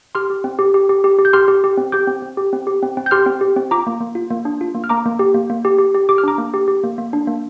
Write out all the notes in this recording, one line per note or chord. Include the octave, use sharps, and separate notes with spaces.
G4 C6 F6
G4
C4
G4
G4
G4
G4
G4
G6
G4 C6 F6
G4
G4
C4
G4 D6 G6
C4
C4
G4
C4
G4
C4
C4
G6
G4 C6 F6
C4
G4
C4
F4 A#5 D6
A#3
A#3
F4
A#3
D4
F4
A#3
F6
A#3 A#5 D6
A#3
G4
A#3
A#3
G4
G4
G4
G4 D6
F6
D4 A#5 D6
A#3
G4
G4
A#3
A#3
D4
A#3